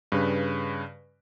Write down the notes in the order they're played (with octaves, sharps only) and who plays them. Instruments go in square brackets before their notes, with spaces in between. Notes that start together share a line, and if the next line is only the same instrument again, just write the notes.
[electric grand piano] G2 C#3 B4